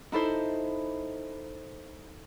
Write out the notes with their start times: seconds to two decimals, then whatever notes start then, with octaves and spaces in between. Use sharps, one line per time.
0.12 D#4 E4 A4 C5